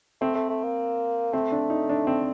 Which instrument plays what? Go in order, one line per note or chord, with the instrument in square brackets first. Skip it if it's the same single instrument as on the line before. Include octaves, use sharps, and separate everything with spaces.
[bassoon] A3 [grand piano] C4
[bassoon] A3
A3
A#3
[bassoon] A3 [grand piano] C4
[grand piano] D4
D#4
D4
C4